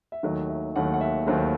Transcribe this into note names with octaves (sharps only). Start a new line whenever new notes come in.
E5
D#2 D#3 F#3 A3 D#5
E5
D#2 D#3 F#3 A3 F#5
F#5
E5
D#2 D#3 F#3 A3 C5